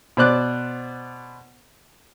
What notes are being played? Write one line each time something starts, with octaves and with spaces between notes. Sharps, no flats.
B2 C5 D5 F#6